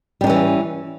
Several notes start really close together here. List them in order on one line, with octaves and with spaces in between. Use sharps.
G3 D4 C#4 E3